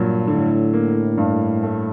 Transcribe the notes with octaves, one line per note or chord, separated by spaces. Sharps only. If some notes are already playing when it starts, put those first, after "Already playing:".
Already playing: G2 A#2 F#3
A2 D3
A#3
G2
A3